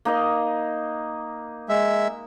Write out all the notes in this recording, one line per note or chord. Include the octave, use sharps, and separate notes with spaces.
A#3 D#4 D#5
G#3 E5